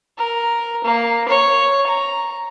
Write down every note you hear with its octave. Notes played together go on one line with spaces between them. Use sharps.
A#4
A#3
C#5
A#5